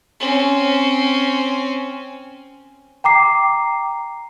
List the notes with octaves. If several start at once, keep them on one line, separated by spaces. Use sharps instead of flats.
C4 C#4
G5 A#5 D6 C7